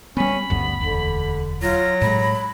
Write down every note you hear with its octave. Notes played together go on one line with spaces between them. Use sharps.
G3 B3 C#4 B5
G1 D2 G2 B3
E1 D2 D3
F#3 F4 A#6
A2 G#3 B5